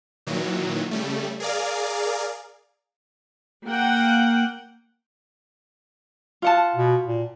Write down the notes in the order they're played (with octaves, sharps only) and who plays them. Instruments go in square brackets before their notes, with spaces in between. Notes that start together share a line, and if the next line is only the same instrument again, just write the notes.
[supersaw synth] A#2 D#3 E3 F#3
C#3 G3 A3
G#4 A#4 D5 F5
[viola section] A#3 F#5 G5
[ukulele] F4 F#5 A5
[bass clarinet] B2
A#2